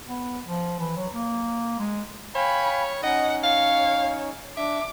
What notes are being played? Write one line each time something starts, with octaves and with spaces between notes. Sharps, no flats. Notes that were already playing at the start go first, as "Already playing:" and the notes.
B3
F3
E3
F#3
A#3
G#3
C#5 F5 G5 G#5 B5
C#4 D#4 D#5 F#5
C#5 F5
D4 E5 D6